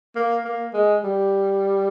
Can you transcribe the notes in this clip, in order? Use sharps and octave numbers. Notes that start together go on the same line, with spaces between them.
A#3
A#3
G#3
G3